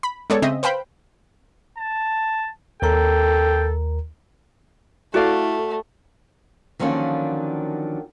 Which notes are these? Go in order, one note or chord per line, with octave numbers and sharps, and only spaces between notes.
B5
G#3 B3 A4 C#5 D5
C#3 C4 D#5 E5
B4 C5 F5 G5 B5
A5
D#2 A4 A#4 G5 A#5
A3 E4 F#4 A4 D5 F5
D3 D#3 F3 F#3 A#3 C#4